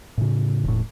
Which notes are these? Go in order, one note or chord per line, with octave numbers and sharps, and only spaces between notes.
A2 C#3
E1 A2